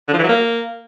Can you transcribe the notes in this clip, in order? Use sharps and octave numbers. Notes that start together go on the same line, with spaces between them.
D3
F3
E3
F#3
A#3